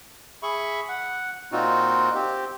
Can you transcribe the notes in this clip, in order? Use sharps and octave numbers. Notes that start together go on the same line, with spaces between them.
G#4 E5 B5 C#6
F#5
A#2 C4 D#4 F4 F#4
C4 G4